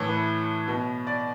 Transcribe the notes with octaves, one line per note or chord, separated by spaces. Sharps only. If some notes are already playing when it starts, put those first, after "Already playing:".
Already playing: A2 E3 C#5
B4
B2
D5